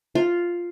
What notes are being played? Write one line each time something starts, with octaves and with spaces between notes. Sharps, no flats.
F4